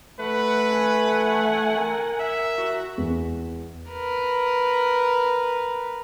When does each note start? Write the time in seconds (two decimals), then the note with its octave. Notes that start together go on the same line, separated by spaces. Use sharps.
0.20 A3 B4 F#5
0.73 F#5 G#5
1.77 A#4
2.20 E5
2.56 F#4
2.98 E2
3.91 A#4 B4